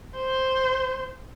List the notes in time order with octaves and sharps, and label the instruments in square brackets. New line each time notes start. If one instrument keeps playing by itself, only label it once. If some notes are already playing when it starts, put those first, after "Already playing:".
[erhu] C5